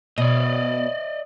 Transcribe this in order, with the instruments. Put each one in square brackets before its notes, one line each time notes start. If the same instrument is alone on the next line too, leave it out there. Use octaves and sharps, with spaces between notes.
[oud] B2 [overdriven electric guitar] D5 D#5